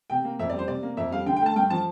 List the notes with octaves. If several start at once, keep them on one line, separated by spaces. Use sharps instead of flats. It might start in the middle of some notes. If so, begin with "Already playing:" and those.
C3 G5
A#3
F2 E5
D5
G3 C5
C3 D5
A#3
F2 E5
G3 F5
D3 G5
G5
A3 A5
G2 G5
F3 A5